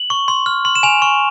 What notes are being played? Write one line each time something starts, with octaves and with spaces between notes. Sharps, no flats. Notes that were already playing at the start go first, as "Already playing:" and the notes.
Already playing: F#7
C#6
C6
F6
C6
E7
G#5 F7
C#6